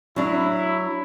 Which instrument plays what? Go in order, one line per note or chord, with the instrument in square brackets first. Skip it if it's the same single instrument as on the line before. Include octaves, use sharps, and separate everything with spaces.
[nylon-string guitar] F#3 D4 [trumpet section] E4